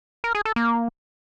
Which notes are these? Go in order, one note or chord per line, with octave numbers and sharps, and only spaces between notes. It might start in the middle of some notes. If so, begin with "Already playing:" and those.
A#4
G#4
A4
A#3